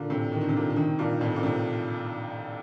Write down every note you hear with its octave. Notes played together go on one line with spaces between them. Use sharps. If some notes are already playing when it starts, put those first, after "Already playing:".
Already playing: A#2 D3
A2 C3
D#3
D3
C3
A#2 D3
D3
C3 D#3
G2 A#2
F2 A2
A#2
A2 C3